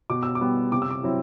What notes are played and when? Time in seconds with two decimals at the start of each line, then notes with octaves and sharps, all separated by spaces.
0.10 B2 D6
0.23 E6
0.35 D6
0.41 G3 B3
0.72 C3 D6
0.82 E6
0.91 D6
1.03 F#3 C4 E4